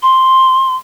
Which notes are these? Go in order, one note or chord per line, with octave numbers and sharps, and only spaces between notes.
C6